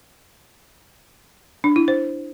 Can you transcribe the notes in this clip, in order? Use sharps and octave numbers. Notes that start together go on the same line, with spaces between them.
D4
E4
C5